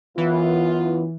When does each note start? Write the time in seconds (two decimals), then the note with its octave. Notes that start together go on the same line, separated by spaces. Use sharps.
0.17 F#2 E3 B3 F4